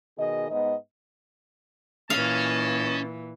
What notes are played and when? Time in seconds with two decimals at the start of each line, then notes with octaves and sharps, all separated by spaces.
0.18 B2 D#3 G#4 D#5
0.51 G#2 B3 D#5
2.10 A#2 E3 C#4 C#5 D#5 F5 A5